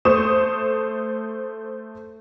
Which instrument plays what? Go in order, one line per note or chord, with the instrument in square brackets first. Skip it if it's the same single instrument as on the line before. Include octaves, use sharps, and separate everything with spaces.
[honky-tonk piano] A3 C5 C#6 D#6 E7